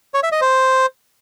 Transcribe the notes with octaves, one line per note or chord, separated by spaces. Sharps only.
C#5
E5
D#5
C5